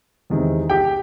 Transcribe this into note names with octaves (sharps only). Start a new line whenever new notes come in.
E2 C3 D#3 G#3
G4 G5